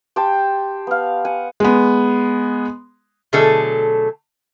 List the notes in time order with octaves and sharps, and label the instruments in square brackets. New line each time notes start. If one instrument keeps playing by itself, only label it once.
[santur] G4 C5 G5 A5
B3 F5
F#5 G#5
[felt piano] G#3 B3
[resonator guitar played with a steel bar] B2 D3 F#3 A3 G#4 A4